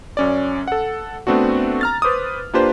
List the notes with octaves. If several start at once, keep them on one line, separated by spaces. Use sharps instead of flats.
F#2 C#4 D5
A4 F#5
A3 B3 C4 D4 F#4
A#5 F6 A6
B4 C5 D6 D#6
A#3 D4 F4 G4 B4 C5